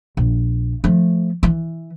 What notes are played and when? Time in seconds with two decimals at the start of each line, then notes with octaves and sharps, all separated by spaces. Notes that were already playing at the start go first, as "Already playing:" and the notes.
0.17 A#1
0.84 F3 A3
1.43 E3